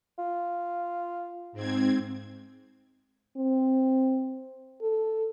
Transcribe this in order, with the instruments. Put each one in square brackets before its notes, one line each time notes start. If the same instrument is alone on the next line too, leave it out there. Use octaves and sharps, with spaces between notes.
[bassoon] F4
[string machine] G#2 C4 G#6
[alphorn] C4
A4